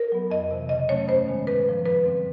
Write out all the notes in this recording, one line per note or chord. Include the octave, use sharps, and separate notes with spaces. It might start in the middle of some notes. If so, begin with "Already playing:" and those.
Already playing: A#4
F#3 B3
F2 D#5
C3 E3
C#3 D#5
F#3 A3 C#4 C#5
G2 C5
D#3 G#3 B3
A2 B4
F3 A#3
F#2 B4
D3 G3 C4